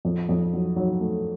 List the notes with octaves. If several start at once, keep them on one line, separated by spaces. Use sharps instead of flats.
F2
F2
F#3
F#3
A3